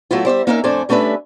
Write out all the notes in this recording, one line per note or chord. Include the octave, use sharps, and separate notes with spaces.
F#3 A3 B3 E4 F4
G3 C5 D5 E5
A#3 C#4 D#4 A#4 E5 F5
F2 A3 D4 C5 D5 G#5
G3 A3 C#4 D4 B4 E5